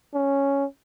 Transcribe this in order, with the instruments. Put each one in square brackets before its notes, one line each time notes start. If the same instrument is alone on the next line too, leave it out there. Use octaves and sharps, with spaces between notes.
[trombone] C#4